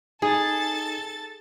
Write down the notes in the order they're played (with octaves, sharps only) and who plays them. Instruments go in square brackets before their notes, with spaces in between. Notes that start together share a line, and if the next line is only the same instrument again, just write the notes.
[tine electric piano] D#4 [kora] G#4 [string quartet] A4 A6